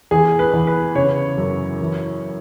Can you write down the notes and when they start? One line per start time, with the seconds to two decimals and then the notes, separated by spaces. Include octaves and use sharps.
0.11 E2 G#4
0.39 B4
0.53 E2
0.67 B4
0.95 C#3 C#5
1.38 F#2
1.80 E3